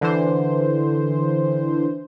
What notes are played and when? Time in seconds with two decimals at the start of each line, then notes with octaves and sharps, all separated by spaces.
0.01 D3 E3 C5